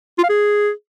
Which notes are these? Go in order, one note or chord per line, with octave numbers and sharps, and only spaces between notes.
F4
F5
G#4